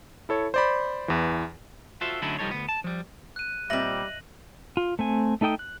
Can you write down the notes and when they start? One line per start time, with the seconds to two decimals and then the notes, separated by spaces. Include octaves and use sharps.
0.29 E4 A4 C#5
0.54 C5 D5 B5
1.08 E2 E3
2.01 F4 F#4 A4 C5 E5
2.22 D3 F#3 A3 C#4 D#4 E4
2.39 C2 F3 G3 D#4 A4 C#5
2.51 D2 B3
2.69 A5
2.84 F3 G3
3.36 F#6 D#7
3.70 A#2 G3 C4 D#5 E5 A#6 F#7
4.77 F4
4.99 A3 C4 G#5
5.41 A3 D#4 A4 G5 D#6
5.59 F#6